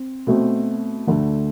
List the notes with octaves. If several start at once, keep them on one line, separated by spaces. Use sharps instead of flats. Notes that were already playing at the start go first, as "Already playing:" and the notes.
Already playing: C4
B2 A3 C4
D2 D3 A3